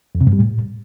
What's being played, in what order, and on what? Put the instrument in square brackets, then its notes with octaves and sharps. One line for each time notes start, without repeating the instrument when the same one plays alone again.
[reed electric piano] F2
C3
G2
G3
A2